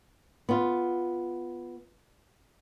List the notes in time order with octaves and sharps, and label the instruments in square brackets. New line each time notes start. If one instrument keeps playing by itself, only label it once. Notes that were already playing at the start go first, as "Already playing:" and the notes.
[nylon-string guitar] B3 F4